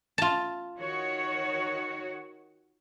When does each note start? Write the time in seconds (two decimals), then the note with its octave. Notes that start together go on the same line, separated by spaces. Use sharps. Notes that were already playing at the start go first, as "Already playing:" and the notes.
0.18 F4 A5
0.76 D#3 F#4 C#5